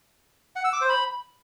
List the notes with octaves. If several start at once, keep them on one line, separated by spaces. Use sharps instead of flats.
F#5
E6
D6
C5
B5